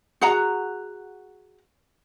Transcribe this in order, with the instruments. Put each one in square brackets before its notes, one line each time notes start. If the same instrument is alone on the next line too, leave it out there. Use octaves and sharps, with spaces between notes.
[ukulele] F#4 G#4 F#5 A#5